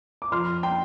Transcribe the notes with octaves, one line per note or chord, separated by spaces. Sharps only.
D6
F2 C6 F6
G5 C6